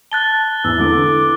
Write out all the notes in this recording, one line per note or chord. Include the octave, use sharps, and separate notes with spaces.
A5 F#6 A6 G7
E2 E3 E6
D3 E4 A4 B4 D6